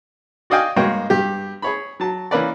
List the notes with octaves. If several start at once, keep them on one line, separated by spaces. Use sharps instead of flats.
F#4 D5 D#5 F5 G5 G#5
G2 G#3 A#3 F#4 C#5 G5
G2 G4
G#4 C#5 B5
F#3 A5
E3 A#3 C#4 A#4 B4 D5